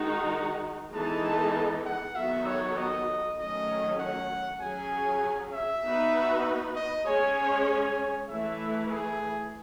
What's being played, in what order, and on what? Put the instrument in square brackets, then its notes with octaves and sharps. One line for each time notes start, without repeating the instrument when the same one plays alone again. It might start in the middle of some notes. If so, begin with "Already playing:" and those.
Already playing: [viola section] D#3 G#3 D#4 F#4 [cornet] F#5
[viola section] E3 G#3 B3 D#4 A4 [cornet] A5
[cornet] F#5
[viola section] D#3 F#3 B3 F#4 A4 [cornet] E5
[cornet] C#5
D#5
[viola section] D#3 F#3 A3 C#4 [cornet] D#5
[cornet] F#5
[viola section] F#3 C#4 G#4 [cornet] G#5
[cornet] E5
[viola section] B3 D#4 F#4 B4
[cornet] D#5
[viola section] G#3 C#4 G#4 C#5 [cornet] G#5
[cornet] G#5
[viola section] E3 A3 E4 B4 [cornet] E5
[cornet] G#4